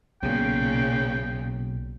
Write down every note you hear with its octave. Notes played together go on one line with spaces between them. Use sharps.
B1 A#2 C#3 G5